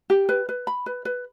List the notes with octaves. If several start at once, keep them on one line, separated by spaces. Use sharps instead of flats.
G4
B4
B4
B5
B4
B4